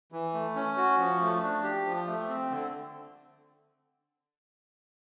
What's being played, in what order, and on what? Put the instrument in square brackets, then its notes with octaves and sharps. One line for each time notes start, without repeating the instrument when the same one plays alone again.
[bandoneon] E3
A3
C#4
F#4
F3
A3
D4
G4
F3
A3
C4
D3